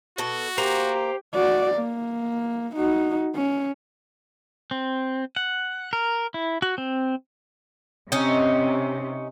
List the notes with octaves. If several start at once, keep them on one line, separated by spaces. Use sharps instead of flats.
B2 F#4 A4
A#3 G4 C5 A#5
F#4 D5
A#3
D#4 F#4
C#4
C4
F#5
A#4
E4
F#4
C4
C3 C#4 D#4